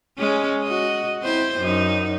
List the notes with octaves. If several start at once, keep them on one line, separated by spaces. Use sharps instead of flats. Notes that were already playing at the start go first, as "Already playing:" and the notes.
G#3 C#4
F#4 D#5
C4 E4 C5
F#2 D#4